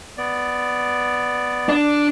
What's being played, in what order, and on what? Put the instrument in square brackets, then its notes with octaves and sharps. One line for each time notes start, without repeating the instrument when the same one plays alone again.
[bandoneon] B3 D5
[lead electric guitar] D4